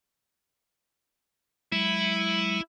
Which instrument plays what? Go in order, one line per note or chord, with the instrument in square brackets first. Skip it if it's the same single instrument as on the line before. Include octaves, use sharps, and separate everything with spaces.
[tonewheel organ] F#3 G#3 [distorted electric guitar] E4